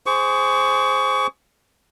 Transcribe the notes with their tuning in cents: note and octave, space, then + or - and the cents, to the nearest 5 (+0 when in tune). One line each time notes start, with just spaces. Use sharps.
G#4 +0 C5 +0 C#6 +30